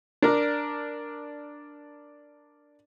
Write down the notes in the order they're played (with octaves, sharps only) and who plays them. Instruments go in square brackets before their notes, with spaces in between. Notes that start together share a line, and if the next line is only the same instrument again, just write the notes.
[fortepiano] D4 A#4 D5